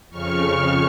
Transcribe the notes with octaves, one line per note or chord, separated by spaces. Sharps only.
F2 C#3 C#6 F6
C#6 F6